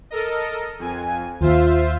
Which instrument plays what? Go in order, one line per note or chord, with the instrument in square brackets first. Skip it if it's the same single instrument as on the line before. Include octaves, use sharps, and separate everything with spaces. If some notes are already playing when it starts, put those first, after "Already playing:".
[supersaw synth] A4 A#4 D#5
F2 G#5
[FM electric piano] D#2 [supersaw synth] F4 C5 E5